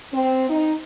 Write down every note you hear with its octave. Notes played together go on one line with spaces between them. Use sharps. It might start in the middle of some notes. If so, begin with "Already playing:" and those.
C4
D#4